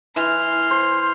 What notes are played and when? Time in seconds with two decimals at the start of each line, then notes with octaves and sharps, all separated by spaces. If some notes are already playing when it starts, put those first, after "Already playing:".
0.16 E3 C6 F6
0.71 C5